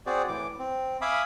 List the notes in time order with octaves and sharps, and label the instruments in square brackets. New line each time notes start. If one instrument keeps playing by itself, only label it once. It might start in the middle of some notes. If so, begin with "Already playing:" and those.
[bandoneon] C4 F#4 G#4 C5 D5
A2 E3 D6
C4
E5 F5 G#5 B5 D6 D#6